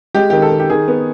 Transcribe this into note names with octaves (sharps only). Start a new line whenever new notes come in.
G#3 G4
D#3 G4
A4
D#3
G4
D#3 G#4
B3